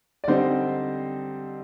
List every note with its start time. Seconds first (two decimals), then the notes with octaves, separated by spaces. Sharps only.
0.24 D5
0.27 D3 G3 C4 D#4 C5